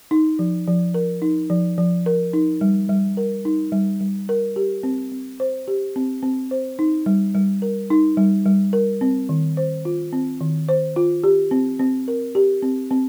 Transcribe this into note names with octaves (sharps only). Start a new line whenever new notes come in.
D#4
F3
F3
A#4
D#4
F3
F3
A#4
D#4
G3
G3
A#4
D#4
G3
G3
A#4
G4
C4
C4
C5
G4
C4
C4
C5
D#4
G3
G3
A#4
D#4
G3
G3
A#4
C4
D#3
C5
F4
C4
D#3
C5
F4
G4
C4
C4
A#4
G4
C4
C4